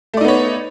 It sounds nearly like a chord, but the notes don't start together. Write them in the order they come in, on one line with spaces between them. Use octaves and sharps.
A3 D5 D#4 B3 C#5